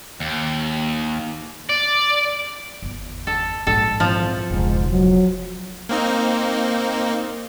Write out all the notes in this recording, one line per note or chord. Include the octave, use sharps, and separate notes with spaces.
D#2
D5
G1 E2
A4
A#1 G#2 A4
E2 F3 C4
E1 C#2 G#2
F#3
A#3 C4 D#4